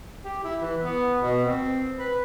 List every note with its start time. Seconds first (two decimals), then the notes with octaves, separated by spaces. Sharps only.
0.24 G4
0.44 E4
0.61 E3
0.82 B3
1.20 B2
1.44 C4
1.98 B4